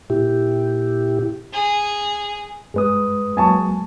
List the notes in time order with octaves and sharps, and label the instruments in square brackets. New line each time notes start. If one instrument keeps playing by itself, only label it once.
[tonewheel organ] A#2 E4 G4
[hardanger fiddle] G#4
[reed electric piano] G2 G#3 [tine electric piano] G#4 B4 D#6
[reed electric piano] F#3 G#3 A#3 [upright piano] G#5 A5 C#6